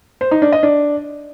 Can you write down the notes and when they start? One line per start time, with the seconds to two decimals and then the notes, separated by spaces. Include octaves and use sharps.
0.21 C5
0.31 D#4
0.42 D4
0.52 D#5
0.63 D4